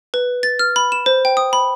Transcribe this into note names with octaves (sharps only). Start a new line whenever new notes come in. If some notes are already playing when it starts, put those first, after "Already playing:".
B4
A6
F6
B5
E7
C5
G5
D#6
B5